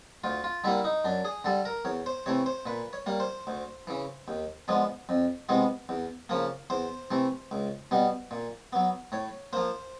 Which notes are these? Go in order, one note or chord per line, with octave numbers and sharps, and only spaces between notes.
D2 F4
F4
D3 G3 A#3 E4
D#4
F#2 D4
G#4
D3 G3 A4
A#4
E2 C#5
C5
C3 E3 A3 C#5
C5
A#2 B4
C#5
G3 A#3
C5
D2
C#3 E3
D#2
D3 F3 G#3 B3
F2
C3 E3 G#3 B3
E2
C#3 F3 A#3
E2 C5
C3 E3 A3
C#2
B2 G3 B3
A#2
F#3 B3
A2 C#5
F3 A#3 C5